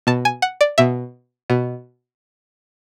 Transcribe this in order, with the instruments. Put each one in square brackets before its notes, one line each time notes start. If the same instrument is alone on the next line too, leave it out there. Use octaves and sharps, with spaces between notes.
[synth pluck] B2 A5
G#5
F#5
D5
B2 E5
B2